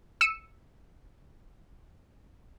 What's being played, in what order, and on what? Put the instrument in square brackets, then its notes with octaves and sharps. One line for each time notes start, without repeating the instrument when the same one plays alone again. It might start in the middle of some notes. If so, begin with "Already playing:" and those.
[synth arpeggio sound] E6 C#7 D#7 E7